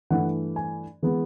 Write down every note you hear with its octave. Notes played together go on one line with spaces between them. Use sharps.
G2 E3 A3 F#5
G#5
E3 G#3 B3